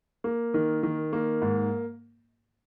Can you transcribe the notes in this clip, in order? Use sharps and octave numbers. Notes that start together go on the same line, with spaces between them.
A#3
D#3
D#3
A#3
G#2